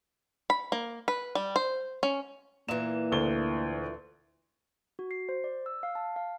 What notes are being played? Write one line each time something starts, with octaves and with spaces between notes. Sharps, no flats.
B5
A#3
B4
G3
C5
C#4
A#2 E3 A#3 E7
D2 G7
F#4
C7
C5
D5
E6
F5
A5
F5